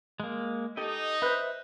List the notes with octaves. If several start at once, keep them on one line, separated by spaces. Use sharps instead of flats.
G#3 A#3
D#4 G4 A4 D#5
B4 C5 E5 F#6